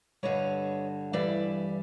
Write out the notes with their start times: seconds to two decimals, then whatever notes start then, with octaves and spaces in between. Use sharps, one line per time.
0.23 G2 D3 G3 C#5 D#5
1.13 G2 E3 G3 D5 E5